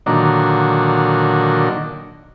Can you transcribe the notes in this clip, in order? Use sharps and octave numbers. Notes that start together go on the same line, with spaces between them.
A#2 D3 D#3 F#3